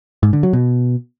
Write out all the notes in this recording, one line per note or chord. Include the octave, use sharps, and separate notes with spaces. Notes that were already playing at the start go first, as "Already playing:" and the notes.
G#2
D3
F#3
B2